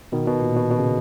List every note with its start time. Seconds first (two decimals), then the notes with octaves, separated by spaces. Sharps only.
0.12 B2 D#3
0.27 B2
0.42 A#2
0.56 B2
0.71 B2
0.78 C#3